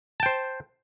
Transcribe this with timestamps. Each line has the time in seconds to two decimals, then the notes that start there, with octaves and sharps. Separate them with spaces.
0.20 A5
0.23 G5
0.26 C5